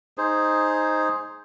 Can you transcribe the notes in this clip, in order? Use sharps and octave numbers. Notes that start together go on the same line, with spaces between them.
D#4 G#4 C5